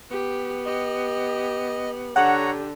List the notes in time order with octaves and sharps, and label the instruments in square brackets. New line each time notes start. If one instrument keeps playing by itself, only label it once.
[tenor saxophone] B3 [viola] G4
[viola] G4 [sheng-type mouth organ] D#5
[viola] D3 [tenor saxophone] G4 [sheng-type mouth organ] C#5 A#5 [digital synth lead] F#5